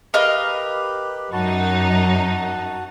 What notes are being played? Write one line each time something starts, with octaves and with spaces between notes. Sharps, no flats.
G4 A#4 B4 D#5 F5
F#2 D#4 F#4 A5